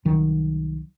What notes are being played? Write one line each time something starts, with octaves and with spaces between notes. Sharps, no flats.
C2 D#3 F#3